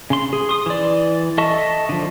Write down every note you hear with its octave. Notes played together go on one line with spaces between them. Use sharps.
C#3 C6
G#4
C6 D#6
E3 D5
A4 D#5 E5 A5 C#6
D3 F3